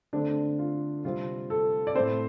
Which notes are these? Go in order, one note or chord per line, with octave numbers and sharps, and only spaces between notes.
D3 A3 C4 D4
D4
F4
C3 G3 C4 F4
A4
D5
A2 A3 C4 C5